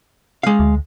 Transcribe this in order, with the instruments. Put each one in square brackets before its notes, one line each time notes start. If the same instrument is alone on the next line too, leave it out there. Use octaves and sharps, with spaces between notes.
[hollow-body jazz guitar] G#3 F5
[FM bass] D2